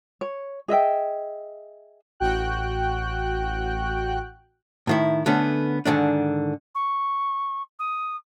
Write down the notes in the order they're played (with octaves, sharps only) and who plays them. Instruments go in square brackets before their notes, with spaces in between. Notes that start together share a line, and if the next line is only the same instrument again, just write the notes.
[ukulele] C#5
G#4 D#5 E5 G5
[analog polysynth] A1 F#4 G5 F#6
[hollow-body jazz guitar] A2 D#3 E4
D3 A3 B3 C#4
G#2 D3 D#3 D4
[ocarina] C#6
D#6